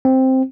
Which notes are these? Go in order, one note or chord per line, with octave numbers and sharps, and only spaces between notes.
C4